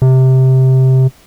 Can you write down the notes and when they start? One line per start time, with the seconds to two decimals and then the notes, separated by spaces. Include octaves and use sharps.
0.02 C3